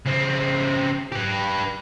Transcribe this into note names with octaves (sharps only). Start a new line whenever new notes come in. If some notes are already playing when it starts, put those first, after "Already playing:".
C#3 C4
G4 B4